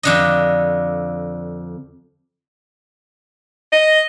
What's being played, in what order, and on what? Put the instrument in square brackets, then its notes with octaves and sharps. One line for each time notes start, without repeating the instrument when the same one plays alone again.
[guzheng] F2 D3 D#5
[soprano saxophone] D#5